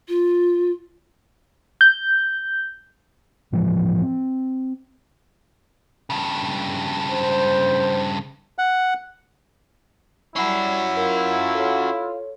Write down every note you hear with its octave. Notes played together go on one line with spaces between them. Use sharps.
F4
G6
A2 E3 F3 G#3
C4
G2 C#3
C5
F#5
G3 C#4 E4 F#4 B5 C7
F4 A#4 E5
A4 C#5